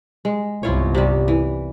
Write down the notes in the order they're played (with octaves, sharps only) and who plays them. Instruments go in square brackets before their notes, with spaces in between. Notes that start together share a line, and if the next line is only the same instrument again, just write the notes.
[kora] G#3
[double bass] G1 C2 [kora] E4 F4 C#5
[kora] C3 G3
E3